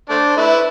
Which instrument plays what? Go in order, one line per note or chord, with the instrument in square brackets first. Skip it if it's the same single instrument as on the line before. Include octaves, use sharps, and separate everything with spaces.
[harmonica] A3 D4 [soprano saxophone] C5
[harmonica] A3 E4 [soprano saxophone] B4